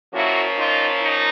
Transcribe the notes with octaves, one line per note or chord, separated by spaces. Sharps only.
A#2 F3 A#3 C#4 E4 F#4
D#4 F4
D#4